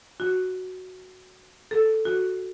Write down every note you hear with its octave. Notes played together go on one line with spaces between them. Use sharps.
F#4
A4
F#4